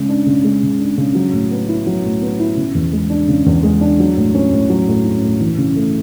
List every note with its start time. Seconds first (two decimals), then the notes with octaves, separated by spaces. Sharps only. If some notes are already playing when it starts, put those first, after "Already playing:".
Already playing: C#3 G#3
0.09 D4
0.26 C#3
0.44 G#3
0.63 C#3
0.80 D4
0.98 C#3
1.15 F#3
1.33 A2
1.51 B3
1.68 E4
1.87 F#3
2.05 A2
2.22 B3
2.39 E4
2.57 C#3
2.75 E2
2.93 G#3
3.10 D4
3.28 C#3
3.46 E2
3.63 G#3
3.81 D4
4.00 F#3
4.17 A2
4.35 C#4
4.52 A2
4.70 F#3
4.88 A2
5.05 C#4
5.23 A2
5.40 E3
5.58 C#3
5.76 A3